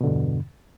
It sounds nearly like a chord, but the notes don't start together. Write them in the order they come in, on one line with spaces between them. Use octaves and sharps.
B2 D3 G2 E2